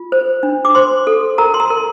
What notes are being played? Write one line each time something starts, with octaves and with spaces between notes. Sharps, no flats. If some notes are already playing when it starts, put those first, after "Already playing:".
Already playing: F4
C5
D4
D6
C5 C6
A4
A#4 A#5
C6
A#5
A#4